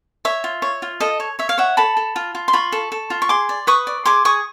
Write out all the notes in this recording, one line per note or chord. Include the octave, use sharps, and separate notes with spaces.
C#5 E5
F4
C#5
F4
A4 D#5
C#5
C#5 E5
F5
C#5 E5 F#5
A4 A5 B5
A4
F4
F4
C6
F4 B5 C#6
A4
A4
F4
C#6
G#4 C6 D6
D5
B4 C#6 D#6
D5
G#4 C6 D6
G#4 C#6 D#6